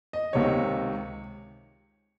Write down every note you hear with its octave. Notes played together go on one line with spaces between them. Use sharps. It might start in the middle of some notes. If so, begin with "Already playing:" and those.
D#5
C#2 C3 D#3 C#5